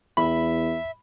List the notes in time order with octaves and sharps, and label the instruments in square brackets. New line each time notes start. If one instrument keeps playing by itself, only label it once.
[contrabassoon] E2 [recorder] E5 [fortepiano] B5